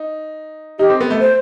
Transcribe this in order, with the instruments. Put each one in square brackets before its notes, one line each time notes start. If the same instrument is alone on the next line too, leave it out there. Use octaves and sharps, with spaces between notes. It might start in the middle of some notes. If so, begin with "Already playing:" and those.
Already playing: [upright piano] D#4
[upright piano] D#4 [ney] G4
[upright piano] C4
B3
A3
[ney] C5